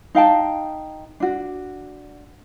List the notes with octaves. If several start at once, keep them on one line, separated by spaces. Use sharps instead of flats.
D#4 F5 G5 A5
D4 F#4